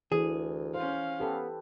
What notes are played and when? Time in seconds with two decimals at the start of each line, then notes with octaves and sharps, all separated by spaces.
0.12 D2 E3 G#4
0.74 C#4 C5 F5
1.20 B3 G4 A4 B4